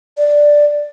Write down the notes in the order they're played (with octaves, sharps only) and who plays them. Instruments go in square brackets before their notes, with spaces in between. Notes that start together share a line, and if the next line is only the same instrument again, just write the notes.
[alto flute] D5